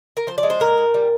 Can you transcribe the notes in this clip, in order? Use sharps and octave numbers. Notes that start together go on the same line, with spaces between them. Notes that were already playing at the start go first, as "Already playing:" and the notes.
A#4
F3 C5
D5
G#3
C5
A#2 A#4
A#2
G3